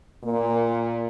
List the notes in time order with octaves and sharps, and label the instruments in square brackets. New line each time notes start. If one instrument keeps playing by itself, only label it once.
[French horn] A#2 [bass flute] A#3